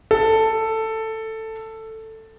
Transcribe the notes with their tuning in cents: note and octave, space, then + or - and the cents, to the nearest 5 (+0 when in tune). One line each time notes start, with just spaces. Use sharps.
A4 +10